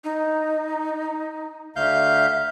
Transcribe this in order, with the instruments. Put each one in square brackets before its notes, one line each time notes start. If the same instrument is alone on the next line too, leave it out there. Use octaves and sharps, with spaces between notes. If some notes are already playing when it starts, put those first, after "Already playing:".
[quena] D#4
[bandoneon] D2 F5 G6 [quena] E5